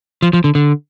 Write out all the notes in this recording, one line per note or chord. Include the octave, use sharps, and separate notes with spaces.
F3
F3
D3
D3